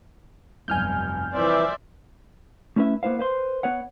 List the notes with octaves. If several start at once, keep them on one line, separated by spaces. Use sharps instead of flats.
F1 B1 G2 G#5 F6 G6
C2 E3 F3 C5 D5 E5
A3 C#4 E4 B4 E5
A#3 B3 E4 C5 F5
B4 C5 C6
B3 B4 C#5 F#5